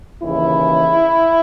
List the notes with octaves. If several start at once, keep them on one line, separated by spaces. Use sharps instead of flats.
D#2 C#3 E3 E4